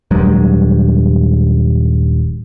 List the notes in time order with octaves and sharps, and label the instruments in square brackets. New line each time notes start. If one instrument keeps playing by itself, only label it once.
[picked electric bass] D#1 G2 F#3 G#3